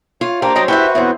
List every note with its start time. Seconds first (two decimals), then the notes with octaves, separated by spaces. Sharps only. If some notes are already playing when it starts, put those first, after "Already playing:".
0.21 F4 C#5
0.42 A#3 D4 G4 C5 A#5
0.55 G2 F#3 D4 D#5 G5
0.68 E4 F#4 G4 B4 D5 E5
0.95 E2 A2 B3 C4 C#5